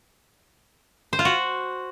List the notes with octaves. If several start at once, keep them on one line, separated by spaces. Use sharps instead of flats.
C5
F4
F#4